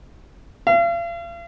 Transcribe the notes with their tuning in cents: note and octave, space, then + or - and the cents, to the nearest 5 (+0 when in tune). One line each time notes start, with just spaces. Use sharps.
F5 -40